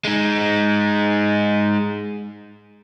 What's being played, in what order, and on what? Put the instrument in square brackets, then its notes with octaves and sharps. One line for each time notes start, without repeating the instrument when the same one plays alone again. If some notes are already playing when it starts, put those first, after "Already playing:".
[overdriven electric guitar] G#3 D#4